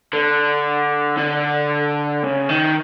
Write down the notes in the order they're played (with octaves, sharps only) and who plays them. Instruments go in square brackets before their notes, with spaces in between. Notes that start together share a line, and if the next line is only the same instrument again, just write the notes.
[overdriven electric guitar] D3
D3
C#3
D#3